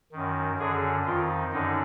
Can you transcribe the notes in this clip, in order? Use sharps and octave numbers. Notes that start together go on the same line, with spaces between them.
F#2 D#3
F#2 D3 G#4
F2 D#3 F4
F#2 D3 D#4